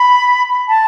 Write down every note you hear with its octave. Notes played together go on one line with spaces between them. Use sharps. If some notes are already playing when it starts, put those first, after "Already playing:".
Already playing: B5
A5